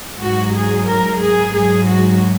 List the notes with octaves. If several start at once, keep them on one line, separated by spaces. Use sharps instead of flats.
G#2 F#3 F#4
G#4
A#4
G#4
G#2 F#3 G#4
F#4